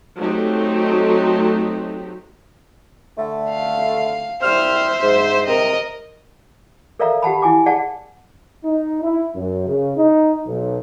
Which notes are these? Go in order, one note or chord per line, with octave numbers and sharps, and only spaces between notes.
F#3 A3 C4 D#4 G4
D3 A3
F5
C2 G3 C5 E5 F6
G#2
C3 A#4 D#5
A4 A#4 D5 E5 F5 A#5
G4 F#5 A5 B5
E4 G#5 D6
G#4 D5 F#5 A5
D#4
E4
F#2
C#3
D#4
B1